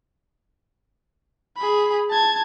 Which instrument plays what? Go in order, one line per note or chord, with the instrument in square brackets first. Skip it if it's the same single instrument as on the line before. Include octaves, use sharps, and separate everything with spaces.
[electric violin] G#4 B5
A5 G#6